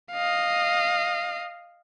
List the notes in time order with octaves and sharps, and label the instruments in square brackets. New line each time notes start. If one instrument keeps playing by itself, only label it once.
[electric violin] D#5 F5